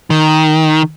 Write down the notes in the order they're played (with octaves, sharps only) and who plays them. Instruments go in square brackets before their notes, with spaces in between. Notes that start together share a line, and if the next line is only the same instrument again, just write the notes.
[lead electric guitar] D#3